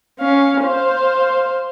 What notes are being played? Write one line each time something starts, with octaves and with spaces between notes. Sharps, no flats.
C#4 F5
C5 F5